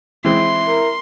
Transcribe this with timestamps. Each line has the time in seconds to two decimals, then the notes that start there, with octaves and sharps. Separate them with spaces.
0.25 E3 G#3 C4 E4 C6
0.66 A#4